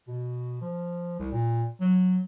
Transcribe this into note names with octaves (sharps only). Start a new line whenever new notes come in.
B2
F3
C2
A#2
F#3